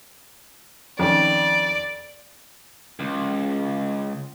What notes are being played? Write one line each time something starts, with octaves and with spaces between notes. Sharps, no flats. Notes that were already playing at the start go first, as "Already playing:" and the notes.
F2 D#3 C#4 D5
C#2